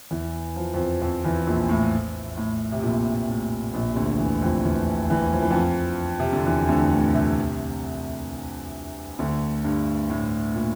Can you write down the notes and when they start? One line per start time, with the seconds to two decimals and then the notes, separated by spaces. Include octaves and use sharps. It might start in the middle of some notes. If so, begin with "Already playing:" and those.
0.11 E2 E3
0.56 F3
0.74 F2 F3
1.01 F2 F3
1.24 E2 E3
1.47 A#1 A#2
1.69 A2
2.37 A2
2.72 C3
2.83 A#1 A#2
3.29 A2
3.74 A#1 A#2
3.90 C3
3.96 D2 D3
4.19 E2 E3
4.42 F2 F3
4.64 E2 E3
5.10 E2 E3
5.33 F3
5.42 E3
5.50 F2 F3
6.20 C3
6.33 D3
6.46 E2 E3
6.68 D2 D3
6.92 A2
7.14 C2 C3
9.19 D2 D3
9.64 G2
10.10 A2
10.54 A#2